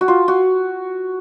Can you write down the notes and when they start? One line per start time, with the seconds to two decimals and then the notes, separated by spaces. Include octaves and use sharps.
0.01 F#4
0.08 F4
0.28 F#4